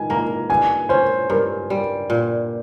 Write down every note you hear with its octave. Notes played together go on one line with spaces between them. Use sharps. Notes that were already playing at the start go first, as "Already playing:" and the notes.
Already playing: D#3 G#5
A#3 A#5
G2 G#5
C#4 C5
G2 A#4
G3
A#2